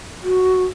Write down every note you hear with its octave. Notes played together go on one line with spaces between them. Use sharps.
F#4